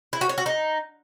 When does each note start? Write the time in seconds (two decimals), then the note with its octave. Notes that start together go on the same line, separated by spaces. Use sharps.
0.13 E4
0.21 F#4
0.29 C#5
0.38 F#4
0.46 D#4